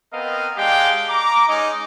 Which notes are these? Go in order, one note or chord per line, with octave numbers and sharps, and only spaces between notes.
B3 C4 A#4 D#5 F5
G#3 D4 G4 F5 G5
A#5 D6
G#3 C#4 D#4